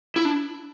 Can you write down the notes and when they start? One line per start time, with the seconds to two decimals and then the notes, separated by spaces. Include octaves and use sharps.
0.16 E4
0.25 D4